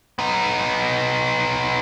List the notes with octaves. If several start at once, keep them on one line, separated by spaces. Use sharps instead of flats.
B3 D#4